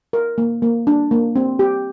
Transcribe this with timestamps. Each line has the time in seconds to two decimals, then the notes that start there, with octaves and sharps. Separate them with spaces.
0.13 A#4
0.38 A#3
0.62 A#3
0.87 D4
1.11 A#3
1.36 C4
1.59 G4